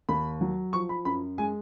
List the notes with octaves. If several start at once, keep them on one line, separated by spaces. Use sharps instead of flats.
D#2 B5
F#3
F3 C#6
B5
F#2 B5
G#3 G#5